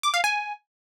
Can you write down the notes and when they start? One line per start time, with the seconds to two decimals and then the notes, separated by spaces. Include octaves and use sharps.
0.03 D6
0.14 F5
0.24 G#5